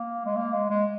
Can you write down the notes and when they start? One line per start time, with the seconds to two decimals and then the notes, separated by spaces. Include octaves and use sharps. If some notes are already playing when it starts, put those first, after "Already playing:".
Already playing: A#3
0.25 G#3
0.36 A#3
0.53 G#3
0.70 G#3